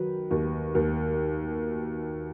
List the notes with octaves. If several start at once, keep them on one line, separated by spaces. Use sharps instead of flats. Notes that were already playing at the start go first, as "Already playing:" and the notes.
Already playing: D#3 F#3 B4
D#2
D#2